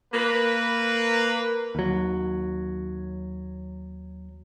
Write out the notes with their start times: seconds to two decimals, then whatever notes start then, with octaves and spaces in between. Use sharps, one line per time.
0.14 A#3 B4
1.75 D#2 F#3